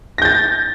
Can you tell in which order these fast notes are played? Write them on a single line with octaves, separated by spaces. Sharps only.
A#6 G6 A6